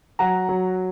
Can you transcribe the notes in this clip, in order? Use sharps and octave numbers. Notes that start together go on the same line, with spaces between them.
F#3 F#5 A#5
F#3